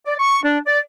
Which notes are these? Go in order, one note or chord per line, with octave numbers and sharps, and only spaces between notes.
D5
C#6
D4
D5